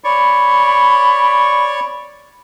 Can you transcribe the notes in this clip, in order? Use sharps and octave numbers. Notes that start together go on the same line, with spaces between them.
C#5 D5 B5 C#6